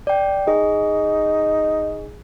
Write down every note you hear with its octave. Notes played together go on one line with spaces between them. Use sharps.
D5 G5
D#4 G#4